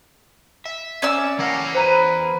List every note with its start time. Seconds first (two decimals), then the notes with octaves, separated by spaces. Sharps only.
0.66 E5
1.02 C#4 D5 E6
1.39 E3 G3 A3 A#3 F#5
1.75 B4 C5 A#5 D#7